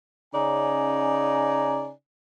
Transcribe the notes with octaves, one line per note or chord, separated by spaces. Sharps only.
C#3 C#4 D#4 D5 G#5 A#5